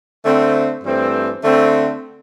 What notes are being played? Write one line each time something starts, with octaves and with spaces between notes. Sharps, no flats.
D3 A3 C4
G2 E3 A3 C4
D3 A3 C4